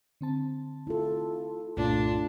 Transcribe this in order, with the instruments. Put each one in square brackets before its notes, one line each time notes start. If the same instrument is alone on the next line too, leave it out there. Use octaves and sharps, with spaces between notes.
[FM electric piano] D3 C4 A5
[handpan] E4 A4 [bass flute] F4
[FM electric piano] C2 G2 A#2 [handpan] A3 [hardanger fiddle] D4 [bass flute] F4